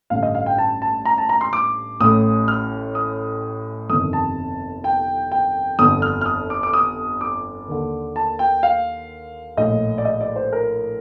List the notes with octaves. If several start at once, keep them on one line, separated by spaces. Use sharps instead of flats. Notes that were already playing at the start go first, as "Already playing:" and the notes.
A1 G2 D3 F5
D#5
F5
G5
A5
A5
A#5
A5
A#5
C6
D6
A1 A2 D#6
F6
D#6
G1 F2 C3 D#3 D#6
A5
G5
G5
G1 F2 D3 D#6
F6
F6
D#6
D6
D6
D#6
D6
D#2 D3
A5
G5
F5
A#1 A2 D#5
D5
D#5
D5
C5
A#4